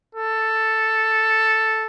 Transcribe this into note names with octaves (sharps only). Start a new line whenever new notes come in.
A4